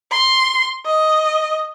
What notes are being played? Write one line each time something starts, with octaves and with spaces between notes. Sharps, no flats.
C6
D#5